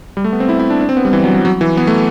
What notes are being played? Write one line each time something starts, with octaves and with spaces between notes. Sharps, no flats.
G3
A3
B3
C4
E4
E4
D4
D4
C4
B3
G3
E3
F#3
F#3
F#3
E3
B3
A3